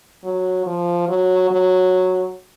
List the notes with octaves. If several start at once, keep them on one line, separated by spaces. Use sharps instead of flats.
F#3
F3
F#3
F#3